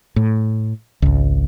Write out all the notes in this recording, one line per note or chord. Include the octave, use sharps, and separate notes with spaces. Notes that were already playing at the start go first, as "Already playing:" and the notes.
A2
G#1 C#2